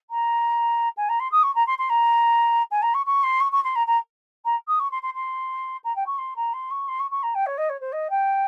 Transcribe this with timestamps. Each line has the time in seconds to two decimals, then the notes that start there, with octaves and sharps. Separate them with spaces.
0.10 A#5
0.97 G#5
1.09 A#5
1.19 C6
1.32 D#6
1.43 C#6
1.55 A#5
1.66 C6
1.78 C6
1.89 A#5
2.71 G#5
2.82 A#5
2.94 C#6
3.06 C#6
3.23 C6
3.40 C#6
3.52 C#6
3.64 C6
3.75 A#5
3.87 A#5
4.45 A#5
4.67 D#6
4.79 C#6
4.91 C6
5.02 C6
5.14 C6
5.84 A#5
5.96 G5
6.06 C#6
6.18 C6
6.36 A#5
6.53 C6
6.70 C#6
6.88 C6
6.99 C#6
7.11 C#6
7.23 A#5
7.34 G5
7.46 C#5
7.57 D#5
7.69 C#5
7.80 C5
7.92 D#5
8.10 G5